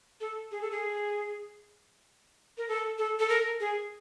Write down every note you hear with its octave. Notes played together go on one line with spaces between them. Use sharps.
A4
G#4
A4
G#4
A#4
A4
A4
A4
A#4
G#4